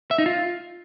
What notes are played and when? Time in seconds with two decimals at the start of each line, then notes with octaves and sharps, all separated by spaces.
0.11 E5
0.18 D#4
0.26 F4